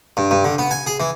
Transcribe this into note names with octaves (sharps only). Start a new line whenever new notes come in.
G2
G2
D3
B3
G#5
G#4
E3